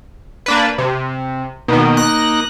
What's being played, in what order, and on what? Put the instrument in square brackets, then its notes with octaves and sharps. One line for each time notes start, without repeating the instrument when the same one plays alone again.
[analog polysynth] A#3 D4 B4
C3
[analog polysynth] B2 D#3 [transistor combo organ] A#3 D#4
[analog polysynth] F#6 A#6